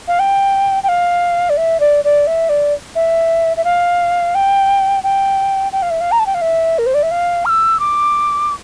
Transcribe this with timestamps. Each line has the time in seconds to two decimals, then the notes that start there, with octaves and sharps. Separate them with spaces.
0.08 F5
0.19 G5
0.83 G5
0.89 F5
1.50 D5
1.57 E5
1.80 D5
2.04 D5
2.27 E5
2.49 D5
2.95 E5
3.57 E5
3.65 F5
4.35 G5
5.03 G5
5.73 G5
5.82 F5
5.90 E5
6.01 F5
6.12 A#5
6.19 A5
6.26 G5
6.35 F5
6.41 E5
6.78 A#4
6.86 C5
6.94 D5
7.03 E5
7.11 F5
7.45 F6
7.49 E6
7.80 D6